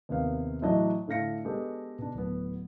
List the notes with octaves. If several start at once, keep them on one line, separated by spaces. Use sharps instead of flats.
D#2 C3 B3 F5
A2 E3 F#3 D4 F#4 D#5
A2 D3 F5 A#6 C#7
G#3 B3 D4 G4 A4
B2 D4
D1 B3